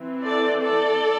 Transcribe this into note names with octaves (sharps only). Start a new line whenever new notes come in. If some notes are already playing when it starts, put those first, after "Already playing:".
Already playing: E3 C4
A4 D5
A4 D5